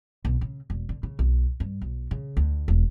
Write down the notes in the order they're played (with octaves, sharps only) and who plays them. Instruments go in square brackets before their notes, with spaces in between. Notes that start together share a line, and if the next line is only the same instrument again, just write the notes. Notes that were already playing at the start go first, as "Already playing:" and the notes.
[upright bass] B1
C#3
E1
D3
C#3
B1
G2
B1
C#3
D2
E1